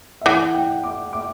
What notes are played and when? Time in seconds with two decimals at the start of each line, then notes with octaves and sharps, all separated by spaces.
0.21 E5
0.26 E3 F#5
0.55 G5
0.83 D6
1.13 D6